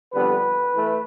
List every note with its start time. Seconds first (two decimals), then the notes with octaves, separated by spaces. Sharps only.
0.14 F2 D3 G3 B3 B4
0.75 E3 A3